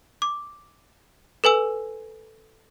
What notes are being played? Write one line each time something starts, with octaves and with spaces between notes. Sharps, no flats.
D6
A4 B4 G#5 E6